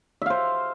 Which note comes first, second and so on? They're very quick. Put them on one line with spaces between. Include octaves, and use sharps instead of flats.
E5 F5 C5